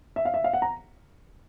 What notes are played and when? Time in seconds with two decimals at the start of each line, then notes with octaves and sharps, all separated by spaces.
0.16 E5
0.25 F5
0.34 E5
0.44 F5
0.53 F#5
0.62 A#5